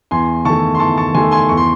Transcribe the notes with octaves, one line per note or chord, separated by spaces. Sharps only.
E2 G#5 C6
D#3 A3 A5 C#6
C6
E2 A5 C#6
A5 C#6
D#3 A3 G#5 C6
G#5 C6
E2 C#6
C6